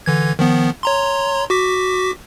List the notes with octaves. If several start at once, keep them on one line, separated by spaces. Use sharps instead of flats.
D3 E3 G#6
D#3 F3 B3
C#5 A#5 C6
F#4 D6 B6